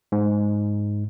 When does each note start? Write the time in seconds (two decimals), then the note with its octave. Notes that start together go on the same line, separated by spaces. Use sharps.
0.12 G#2